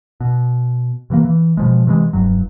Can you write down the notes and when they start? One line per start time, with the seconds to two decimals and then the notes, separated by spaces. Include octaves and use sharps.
0.20 B2
1.10 C3 E3 F3 A#3
1.25 E3
1.57 B2 F3 G#3
1.87 C3 E3 F#3 G#3
2.13 F1 G2 F#3